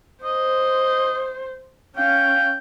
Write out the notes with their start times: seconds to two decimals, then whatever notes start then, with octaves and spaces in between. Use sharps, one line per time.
0.24 C5 D#5
1.96 C#4 F5 G5